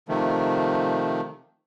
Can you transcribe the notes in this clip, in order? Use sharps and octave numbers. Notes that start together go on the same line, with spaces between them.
C3 D#3 F3 A3